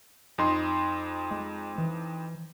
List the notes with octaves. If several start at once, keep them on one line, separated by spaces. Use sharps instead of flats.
F2 D#4 C6
G#3
E3